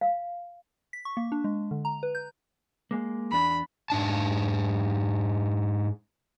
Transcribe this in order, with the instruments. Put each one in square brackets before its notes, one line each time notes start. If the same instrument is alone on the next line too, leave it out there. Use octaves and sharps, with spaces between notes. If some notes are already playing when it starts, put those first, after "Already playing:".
[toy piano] F5
[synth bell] B6
C#6
A#3
D4
G#3
D3
A#5
B4
G6
[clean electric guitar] G#3 A#3
[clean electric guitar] E2 D4 [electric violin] B5
[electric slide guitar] G#2 D4 A5